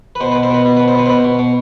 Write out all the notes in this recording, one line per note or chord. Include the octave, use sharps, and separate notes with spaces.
B4
B2 C5
B2 B4
C5
B2 B4
B2
B2 B4
C5
B2 B4
C5
B2 B4
B2
B2